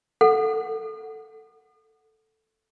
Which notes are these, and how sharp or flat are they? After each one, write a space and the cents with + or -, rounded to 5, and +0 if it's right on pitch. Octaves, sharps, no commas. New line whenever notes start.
A4 +0 F#5 +0